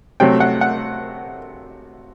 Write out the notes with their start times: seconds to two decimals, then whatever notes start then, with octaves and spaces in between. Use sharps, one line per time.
0.20 C3 F#3 A3 G5
0.40 F#5
0.61 F#5